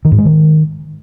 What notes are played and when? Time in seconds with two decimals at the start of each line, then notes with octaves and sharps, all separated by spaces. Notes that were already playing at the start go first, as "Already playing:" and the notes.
0.05 D#3
0.12 G#2
0.18 G#3
0.25 D#3